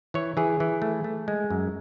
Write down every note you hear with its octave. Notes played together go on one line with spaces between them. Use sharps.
E3 C#5
E3 G#4
E3
A3
A3
G#3
F#2